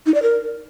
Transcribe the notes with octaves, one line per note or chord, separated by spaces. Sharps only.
D#4
D5
A#4